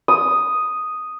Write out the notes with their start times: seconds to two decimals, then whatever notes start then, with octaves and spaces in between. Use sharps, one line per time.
0.08 D#6